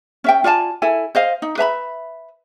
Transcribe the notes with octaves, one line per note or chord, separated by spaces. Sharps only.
C#4 E5 G5
F4 D5 G#5 A5
E4 A4 G#5
C5 D#5 F5
D#4
B4 E5 A#5 B5